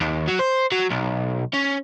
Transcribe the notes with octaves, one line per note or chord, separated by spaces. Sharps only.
D#2
F#3
C5
F#3
B1
C#4